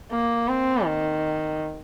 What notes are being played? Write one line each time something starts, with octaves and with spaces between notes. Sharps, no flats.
A#3
C4
D#3